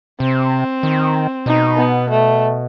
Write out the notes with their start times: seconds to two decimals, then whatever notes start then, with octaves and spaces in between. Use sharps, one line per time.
0.20 C3 C4
0.83 D#3
1.46 B2 D#4
1.77 B3
2.09 A3